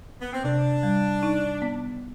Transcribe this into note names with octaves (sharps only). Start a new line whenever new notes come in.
B3
C4
C3 D4
G3
D#4
B3